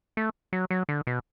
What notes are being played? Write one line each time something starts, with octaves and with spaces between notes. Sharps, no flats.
A3
F#3
F#3
D3
B2